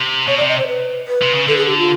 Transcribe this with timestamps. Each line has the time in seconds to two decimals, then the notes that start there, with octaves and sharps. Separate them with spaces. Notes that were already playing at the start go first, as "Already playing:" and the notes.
Already playing: C3
0.27 B2 C#5
0.38 D5
0.42 C3
0.49 D#5
0.59 C5
0.68 B4
1.08 B4
1.22 C3
1.35 C#3
1.48 D3 A4
1.57 G#4
1.67 G4
1.78 F4